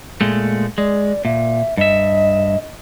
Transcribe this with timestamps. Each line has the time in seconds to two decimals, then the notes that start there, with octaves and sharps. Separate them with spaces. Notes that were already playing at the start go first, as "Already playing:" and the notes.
0.21 A#2 G#3 A3
0.78 G#3 D5
1.25 A#2 E5
1.77 G2 D#5 E5